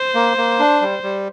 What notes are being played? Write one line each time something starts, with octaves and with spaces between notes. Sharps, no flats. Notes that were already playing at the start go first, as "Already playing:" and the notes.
Already playing: C5
A#3
A#3
D4
G3
G3